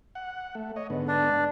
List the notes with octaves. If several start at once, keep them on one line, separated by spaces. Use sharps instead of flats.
F#5
A3
C#5 D#5
G#2 D3 B3
D4